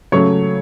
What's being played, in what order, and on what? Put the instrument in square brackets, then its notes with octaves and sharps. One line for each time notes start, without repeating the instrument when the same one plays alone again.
[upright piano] C#3 F#3 A3 C#5 C#6